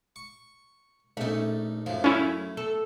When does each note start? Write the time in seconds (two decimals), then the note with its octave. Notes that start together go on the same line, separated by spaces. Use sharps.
0.16 C#6
1.17 A#1 A3 C#4 D#4
1.86 F#2 A2 F3
2.04 A3 C#4 E4
2.57 A4